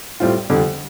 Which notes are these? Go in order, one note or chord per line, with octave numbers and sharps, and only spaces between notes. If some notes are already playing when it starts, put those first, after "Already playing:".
A2 G3 C4 F4
F2 D3 G3